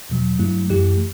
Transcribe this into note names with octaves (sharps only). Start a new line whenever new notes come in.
E2 B2 F#3
G2 F#3 A3 E4
F#2 E3 A3 E4 G4